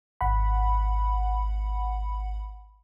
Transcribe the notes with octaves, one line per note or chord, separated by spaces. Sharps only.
G#1 F#5 B5